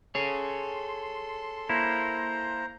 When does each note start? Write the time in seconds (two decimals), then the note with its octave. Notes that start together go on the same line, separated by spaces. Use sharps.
0.15 G#4 A4 C#5 C6
1.69 A#3 E4 C5 A#5